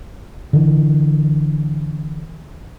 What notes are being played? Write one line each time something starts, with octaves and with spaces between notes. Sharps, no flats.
D3 E3